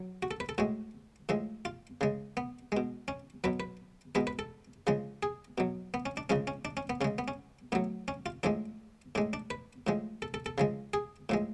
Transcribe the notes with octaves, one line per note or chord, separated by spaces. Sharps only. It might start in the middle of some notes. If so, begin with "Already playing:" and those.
Already playing: F#3
F#4
A4
B4
A4
A2 G#3 F#4
A2 F3 G#3
F4
C#3 G#3
B3
B2 G#3
C#4
B2 F#3 B4
B4
B2 G#3 B4
B4
A4
C#3 F3 G#3
G#4
B2 F#3
B3
C#4
D4
C#3 F3 G#3 C#4
C#4
D4
C#4
B3
C#3 G#3 C#4
B3
C#4
A2 F#3 B3
C#4
F4
A2 F3 G#3 D4
A2 G#3 D4
D4
B4
A2 F3 G#3
A4
A4
A4
C#3 F3 G#3
G#4
A2 F3 G#3